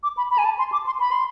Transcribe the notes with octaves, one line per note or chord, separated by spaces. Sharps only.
D6
B5
B5
G#5
A5
C6
D6
C6
B5
C6